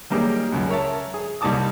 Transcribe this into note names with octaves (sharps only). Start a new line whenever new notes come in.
F#3 G3 A#3 D#4 G4 G#4
C#2 F#2
A#4 C#5 E5 A5
G#4
C2 G3 D#4 A5 D6 D#6